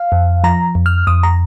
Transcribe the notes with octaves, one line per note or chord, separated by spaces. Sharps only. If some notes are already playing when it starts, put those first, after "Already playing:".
Already playing: F5
F2
F3 A#5
F2
F6
F2 D#6
A#5